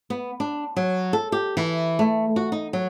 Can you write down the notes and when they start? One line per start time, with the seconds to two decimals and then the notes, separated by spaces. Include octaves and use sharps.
0.10 B3
0.40 D4
0.76 F#3
1.13 A4
1.32 G4
1.57 E3
1.99 A3
2.36 F#4
2.52 D#4
2.73 F#3